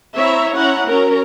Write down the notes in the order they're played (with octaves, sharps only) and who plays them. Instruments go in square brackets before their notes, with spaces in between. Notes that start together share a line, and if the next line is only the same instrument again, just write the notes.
[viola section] C4 E4 C#5 E5 A#5
C#4 E4 F#5 A#5
F#3 C#4 A#4 A#5